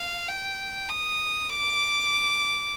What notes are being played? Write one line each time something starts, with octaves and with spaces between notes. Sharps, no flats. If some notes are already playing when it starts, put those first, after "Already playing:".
Already playing: F5
G5
D#6
D6